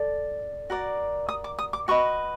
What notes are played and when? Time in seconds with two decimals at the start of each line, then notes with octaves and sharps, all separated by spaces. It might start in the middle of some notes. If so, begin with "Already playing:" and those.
Already playing: A4 D5
0.70 F#4 A#4 D5
1.29 D#6
1.44 D6
1.59 D#6
1.73 D6
1.88 F#4 B4 D#5 C#6